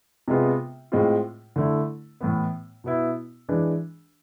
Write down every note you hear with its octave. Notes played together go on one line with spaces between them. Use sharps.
C3 G#3 B3 F4
A2 G#3 C4 F4
D3 A3 E4
A2 E3 B3
B2 B3 E4
E3 G#3 D4